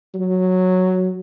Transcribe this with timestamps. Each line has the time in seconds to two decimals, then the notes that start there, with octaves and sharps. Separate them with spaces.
0.15 F#3